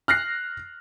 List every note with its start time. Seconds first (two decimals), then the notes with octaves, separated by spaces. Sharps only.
0.08 F6 F#6 A#6 C7